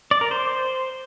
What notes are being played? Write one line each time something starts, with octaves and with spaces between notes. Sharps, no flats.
D5
A#4
C5